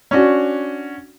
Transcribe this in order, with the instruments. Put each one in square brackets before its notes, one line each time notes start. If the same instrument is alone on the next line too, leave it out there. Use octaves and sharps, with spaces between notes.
[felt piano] C#4 D4 F#4